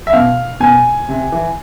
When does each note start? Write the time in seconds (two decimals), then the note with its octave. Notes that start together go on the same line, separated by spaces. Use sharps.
0.07 E5
0.13 B2 F5
0.60 B2 G#5
1.09 C3
1.32 E3